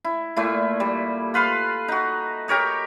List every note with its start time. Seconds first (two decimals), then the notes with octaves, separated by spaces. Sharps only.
0.04 E4
0.36 A#2 A3 E4
0.80 G3
1.34 F4 B4 F5 C6
1.88 D#4 F#4
2.48 G4 A#4 C#5 D#5